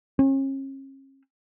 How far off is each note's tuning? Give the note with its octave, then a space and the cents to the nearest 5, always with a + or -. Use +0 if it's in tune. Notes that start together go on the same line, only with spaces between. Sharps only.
C#4 -40